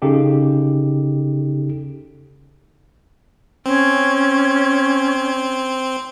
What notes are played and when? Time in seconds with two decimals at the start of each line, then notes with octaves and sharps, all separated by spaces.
0.02 C#3 D#4 G4 A4
3.66 C4 C#4